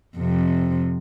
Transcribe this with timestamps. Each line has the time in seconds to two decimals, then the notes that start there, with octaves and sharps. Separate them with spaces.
0.17 F2 C3